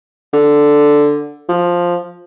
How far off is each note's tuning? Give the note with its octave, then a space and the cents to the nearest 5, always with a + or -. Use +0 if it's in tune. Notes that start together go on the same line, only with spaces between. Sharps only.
D3 +0
F3 +5